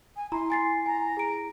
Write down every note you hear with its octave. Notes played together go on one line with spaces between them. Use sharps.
G#5
E4 A#5 C6
G#5 A6 C7
G#5 A#5
G#4 D7